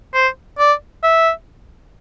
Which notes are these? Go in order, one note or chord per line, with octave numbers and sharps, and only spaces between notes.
C5
D5
E5